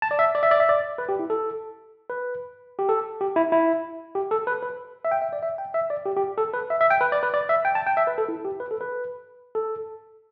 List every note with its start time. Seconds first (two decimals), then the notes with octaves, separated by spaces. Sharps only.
0.02 A5
0.11 D5
0.19 E5
0.35 D5
0.43 E5
0.51 D5
0.60 E5
0.69 D5
0.98 B4
1.09 G4
1.19 E4
1.30 A4
2.10 B4
2.79 G4
2.89 A4
3.21 G4
3.36 E4
3.52 E4
4.15 G4
4.31 A4
4.47 B4
4.63 B4
5.05 E5
5.11 G5
5.22 E5
5.33 D5
5.43 E5
5.58 G5
5.74 E5
5.90 D5
6.06 G4
6.17 G4
6.38 A4
6.54 B4
6.70 E5
6.81 E5
6.90 G5
7.01 B4
7.12 D5
7.23 B4
7.34 D5
7.49 E5
7.65 G5
7.75 A5
7.87 G5
7.97 E5
8.07 B4
8.18 A4
8.29 E4
8.45 G4
8.60 B4
8.71 A4
8.81 B4
9.55 A4